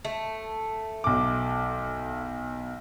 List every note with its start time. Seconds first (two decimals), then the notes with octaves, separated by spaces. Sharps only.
0.05 A3
1.04 B1 D6